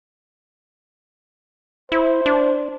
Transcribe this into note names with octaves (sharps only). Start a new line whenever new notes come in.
E4 C5
D4